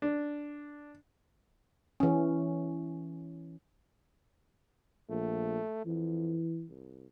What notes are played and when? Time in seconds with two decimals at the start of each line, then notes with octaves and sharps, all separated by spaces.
0.02 D4
2.00 E3 C#4
5.09 A#1 A3
5.86 F2 E3
6.68 C2